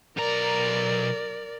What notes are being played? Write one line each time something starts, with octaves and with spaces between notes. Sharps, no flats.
B1 A#4 D5 A#5